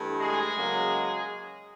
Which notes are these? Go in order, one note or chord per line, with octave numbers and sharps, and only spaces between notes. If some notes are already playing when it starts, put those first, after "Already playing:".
Already playing: G2 E3 A3
G#3 G#4
C#3 F#3 A#3